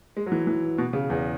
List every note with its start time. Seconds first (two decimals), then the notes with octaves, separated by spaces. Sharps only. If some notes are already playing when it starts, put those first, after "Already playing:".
0.17 G#3
0.26 F#3
0.32 E3
0.47 E3
0.78 B2
0.93 C#3
1.10 E2